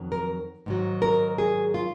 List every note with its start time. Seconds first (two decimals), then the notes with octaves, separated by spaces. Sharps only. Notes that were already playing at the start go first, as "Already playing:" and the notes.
Already playing: F2 D#3 F#3
0.12 A#4
0.66 G#2 D#3 F#3
1.02 A#4
1.38 G#4
1.74 F4